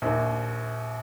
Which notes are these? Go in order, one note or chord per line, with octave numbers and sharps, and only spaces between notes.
A#1 D#2